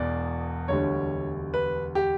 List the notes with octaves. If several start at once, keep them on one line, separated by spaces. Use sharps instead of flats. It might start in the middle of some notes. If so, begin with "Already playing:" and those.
Already playing: E1 E2 B2 D5
E1 D2 D3 G3 C#5
B4
G4